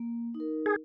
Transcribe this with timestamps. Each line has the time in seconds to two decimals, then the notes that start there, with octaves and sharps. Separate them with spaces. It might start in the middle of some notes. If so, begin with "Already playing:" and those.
Already playing: A#3
0.35 D#4
0.40 A#4
0.66 G#4